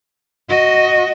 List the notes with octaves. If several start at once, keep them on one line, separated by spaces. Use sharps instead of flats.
F#4 D#5